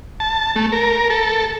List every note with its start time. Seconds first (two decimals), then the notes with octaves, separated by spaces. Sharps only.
0.20 A5
0.56 A3
0.72 A#4
1.10 A4